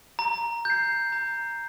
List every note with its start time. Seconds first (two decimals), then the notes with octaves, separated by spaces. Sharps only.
0.19 A#5
0.65 G6 C7
1.12 A#5